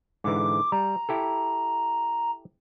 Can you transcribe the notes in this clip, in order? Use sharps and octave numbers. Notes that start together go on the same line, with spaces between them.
G#2 D3 E3 D6
G3 A#5
E4 G4 A4